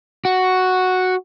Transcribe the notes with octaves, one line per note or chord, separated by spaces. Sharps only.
F#4